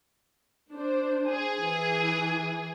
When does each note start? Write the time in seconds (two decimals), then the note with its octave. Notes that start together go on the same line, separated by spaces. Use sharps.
0.73 D4 C5
1.28 G#4
1.60 E3